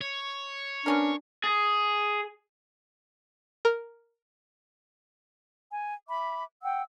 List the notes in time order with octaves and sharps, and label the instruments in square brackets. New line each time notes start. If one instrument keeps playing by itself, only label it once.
[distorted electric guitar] C#5
[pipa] B3 C#4 A#4 [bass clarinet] D4
[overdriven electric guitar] G#4
[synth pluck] A#4
[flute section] G#5
E5 B5 D6
F#5 G5 E6